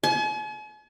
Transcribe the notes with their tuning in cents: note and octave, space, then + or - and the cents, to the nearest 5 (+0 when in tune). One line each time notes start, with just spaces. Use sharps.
G#5 +45